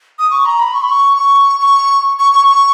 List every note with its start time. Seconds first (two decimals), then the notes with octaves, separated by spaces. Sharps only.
0.19 D#6
0.31 C#6
0.45 A#5
0.60 B5
0.73 C#6
0.82 B5
0.89 C#6
1.17 C#6
1.60 C#6
2.19 C#6
2.33 C#6
2.47 C#6